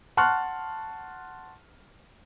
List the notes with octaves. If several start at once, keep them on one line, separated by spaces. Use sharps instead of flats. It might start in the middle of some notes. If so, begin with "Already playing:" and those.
F#5 A5 C6 C#6 F6 F#6